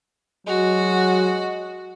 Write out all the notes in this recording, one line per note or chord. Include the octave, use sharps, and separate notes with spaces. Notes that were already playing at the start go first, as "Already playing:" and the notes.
F#3 G#3 F#4